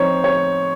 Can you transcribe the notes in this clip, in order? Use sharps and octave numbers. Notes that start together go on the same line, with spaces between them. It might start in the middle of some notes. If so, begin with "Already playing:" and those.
Already playing: F3 C4 D#4 C5 C#5
C#5